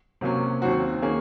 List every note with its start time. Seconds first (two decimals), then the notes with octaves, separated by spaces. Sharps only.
0.21 C3 F#3 A#3 C#4
0.62 D#2 D#3 F#3 C4 F#4
1.02 D#3 A#3 C#4 G#4